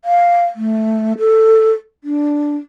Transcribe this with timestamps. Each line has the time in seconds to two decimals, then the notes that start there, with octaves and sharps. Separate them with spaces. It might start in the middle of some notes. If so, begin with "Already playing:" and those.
0.05 F5
0.56 A3
1.19 A4
2.04 D4